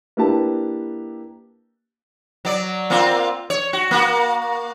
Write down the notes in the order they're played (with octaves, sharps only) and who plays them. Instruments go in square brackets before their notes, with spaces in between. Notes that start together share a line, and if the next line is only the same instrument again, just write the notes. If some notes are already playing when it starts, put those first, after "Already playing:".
[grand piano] A#3 D4 E4 G4 B4 A5
[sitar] F#3 D5
A#3 C4 F4
C#5
F#4
A#3 F#4